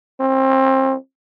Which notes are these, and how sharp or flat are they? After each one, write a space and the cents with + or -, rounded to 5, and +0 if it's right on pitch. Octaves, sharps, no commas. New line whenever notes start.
C4 +30